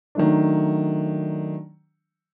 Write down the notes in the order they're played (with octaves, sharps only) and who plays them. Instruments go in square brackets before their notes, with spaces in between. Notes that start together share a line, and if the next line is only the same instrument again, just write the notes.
[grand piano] D#3 F#3 A3 D4